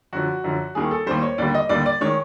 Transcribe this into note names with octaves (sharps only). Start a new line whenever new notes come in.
F#2 D3 F3 F#4
F#2 D3 F3
D#2 D#3 G3 G#4
A4
D#2 D#3 G3 C5
C#5
D#2 D3 G3 D5
D#5
D#2 D3 G3 D5
D5
D#3 G#3 C#5